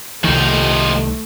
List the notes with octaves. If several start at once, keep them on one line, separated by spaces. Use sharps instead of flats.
C2 D#3 F3 A3 D#4